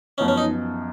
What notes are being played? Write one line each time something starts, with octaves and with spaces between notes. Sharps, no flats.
F#2 F3 B3 C#4 D#4
C#4
D#4